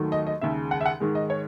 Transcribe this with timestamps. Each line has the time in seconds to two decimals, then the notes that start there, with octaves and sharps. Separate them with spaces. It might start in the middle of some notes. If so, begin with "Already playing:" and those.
Already playing: D#2 D#3 F#3 A3
0.12 D#5
0.27 D#5
0.41 D#2 C#3 G#3 E5
0.71 F#5
0.81 E5
0.86 F#5
1.00 G#2 D#3 G#3
1.15 D#5
1.30 C#5